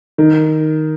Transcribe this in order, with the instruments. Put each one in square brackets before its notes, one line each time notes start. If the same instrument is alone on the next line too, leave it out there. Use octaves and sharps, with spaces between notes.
[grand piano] D#3